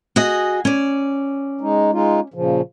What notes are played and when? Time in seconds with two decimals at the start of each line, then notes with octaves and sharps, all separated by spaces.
0.16 F#4 G#4 D#5
0.65 C#4 D5
1.61 G#3 D#4
1.92 G#3 D#4 F4
2.34 A#2 C#3 F3